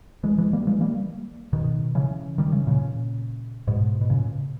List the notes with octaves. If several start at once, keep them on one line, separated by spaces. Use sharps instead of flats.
E3 G#3
E3 G#3
G3 A#3
E3 G#3
G3 A#3
B2 D#3
C#3 E3
D#3 G3
C#3 E3
A#2 C#3
G#2 B2
B2
A#2 C#3